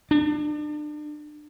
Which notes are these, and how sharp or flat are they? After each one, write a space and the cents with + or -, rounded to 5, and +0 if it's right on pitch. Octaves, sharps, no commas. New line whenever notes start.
D4 +30